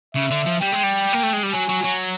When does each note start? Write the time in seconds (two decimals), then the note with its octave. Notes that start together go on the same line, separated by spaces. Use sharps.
0.15 C#3 E5
0.30 D3
0.46 F3
0.61 G3 G5
0.72 G#3
0.83 G3
1.13 A#3
1.23 A3
1.33 G#3
1.43 G3
1.53 F#3 G#5
1.68 F#3
1.84 F#3